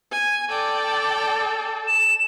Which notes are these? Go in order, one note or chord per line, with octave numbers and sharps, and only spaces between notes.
G#5
A4 D5 G5
E7